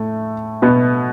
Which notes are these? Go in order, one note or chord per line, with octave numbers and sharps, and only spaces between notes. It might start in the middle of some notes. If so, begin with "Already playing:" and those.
Already playing: A2 A3
B2 B3